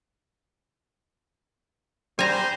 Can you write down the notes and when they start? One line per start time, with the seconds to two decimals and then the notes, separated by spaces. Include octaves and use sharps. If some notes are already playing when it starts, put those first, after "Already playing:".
2.19 G3 C5 G#5 A#5